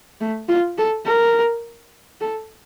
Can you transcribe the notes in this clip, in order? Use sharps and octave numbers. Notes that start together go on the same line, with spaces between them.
A3
F4
A4
A#4
A4